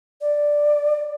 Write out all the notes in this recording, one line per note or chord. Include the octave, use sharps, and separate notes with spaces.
D5